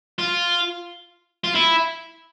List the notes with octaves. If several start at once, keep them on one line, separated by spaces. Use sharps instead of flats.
F4
F4
E4